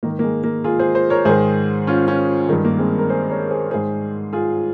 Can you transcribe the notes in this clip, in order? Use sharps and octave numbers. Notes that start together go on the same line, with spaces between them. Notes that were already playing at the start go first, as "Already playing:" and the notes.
G#2 D#3 A#3
A#3
G#3
A#3
F4 G#4
G#4 C5
G#4 C5
A#4 C#5
G#2 D#3 G#4 C5
C#4 F4
C#4 F4
G2 D#3 G#3
A#3
G#3 C4
A#4
G#4 C5
A#4 C#5
G#4 C5
G#2 D#3 G#4 C5
F4 G#4